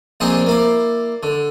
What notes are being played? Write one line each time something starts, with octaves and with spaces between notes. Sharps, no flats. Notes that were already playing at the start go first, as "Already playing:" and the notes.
A#1 C4 D4 D#4 D#5 G#5
A#3 E4 D5
D3